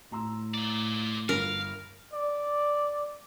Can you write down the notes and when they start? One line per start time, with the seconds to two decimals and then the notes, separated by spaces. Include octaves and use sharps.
0.12 A2 A#5 C6 E6
0.54 F4 D5
1.29 G1 A#4 F5
2.13 D5